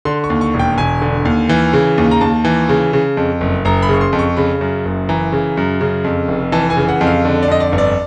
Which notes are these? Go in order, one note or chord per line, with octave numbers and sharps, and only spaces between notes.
D3 C6
C#6
D#2
C#6
E1
G5
E1 G#5
D3
D#2
E3
C#3
D#2
A#5
D#2 A5
E3
C#3
C#3
F2
F#1
F#1 A#5
B5
C#3 C#6
C6
F2
C#6
C#3 B5
F#2
F#1
E3 A#5
C#3
F#2
C#3
F2
F1
E3 A5
G#5
C#3
F#5
F2
F5
D3
D5
F2 D#5
D5
G1
D5